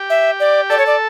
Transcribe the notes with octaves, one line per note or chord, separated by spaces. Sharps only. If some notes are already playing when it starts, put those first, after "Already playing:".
Already playing: G4
E5
D5
A4 D5
C#5
D5